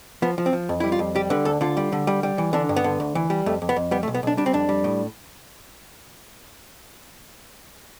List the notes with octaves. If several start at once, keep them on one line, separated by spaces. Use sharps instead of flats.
F3 B3
F3
C4
F3
F2
G3 E4
F4
F2
G3 G4
D3 B4
D2 A4
D3 F4
G3
D3
G3
G3
E3
D3 D4
G2
B3
D3
D2
E3
G3
F2 A3
F2
B3
F2
G3 B3
A3
B1
B3
B1 D4
G3 D4
C4
F2 D4
G3
A2